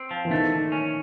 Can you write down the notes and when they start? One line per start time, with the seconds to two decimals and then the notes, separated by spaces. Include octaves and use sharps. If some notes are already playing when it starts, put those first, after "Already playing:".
Already playing: C4
0.11 F3
0.25 E3
0.31 D#3 A3
0.52 A#2
0.72 C#4